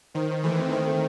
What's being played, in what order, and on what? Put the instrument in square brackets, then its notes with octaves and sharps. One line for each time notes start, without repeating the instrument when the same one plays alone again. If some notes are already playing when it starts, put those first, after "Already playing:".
[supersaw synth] D#3 [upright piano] C5
[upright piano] C5
[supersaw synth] E3 [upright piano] A3
[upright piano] C4
[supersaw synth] D#3 [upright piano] C4
[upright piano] A3